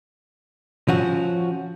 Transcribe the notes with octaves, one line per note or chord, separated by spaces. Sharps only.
F3 C#4 F#4